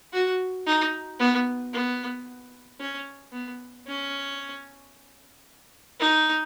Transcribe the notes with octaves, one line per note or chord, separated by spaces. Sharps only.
F#4
D#4
B3
B3
C#4
B3
C#4
D#4